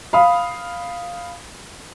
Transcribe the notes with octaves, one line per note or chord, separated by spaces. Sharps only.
F5 B5 D#6